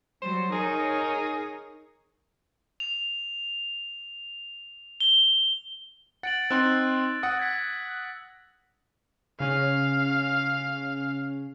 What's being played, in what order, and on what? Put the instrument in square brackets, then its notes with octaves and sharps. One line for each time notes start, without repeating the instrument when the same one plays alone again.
[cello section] F#3 G3 [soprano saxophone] C5
[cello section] D#4 A#4 C#5 [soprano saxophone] G#4
[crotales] F7
G7
[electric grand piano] F#5 [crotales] A6 D7 F#7
[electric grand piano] C4 D#4 C6 [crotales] E6 F#6 A6
[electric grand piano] F#5 D#6 [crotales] A#6
[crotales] G#6 B6
[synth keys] C#3 C#4 [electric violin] F5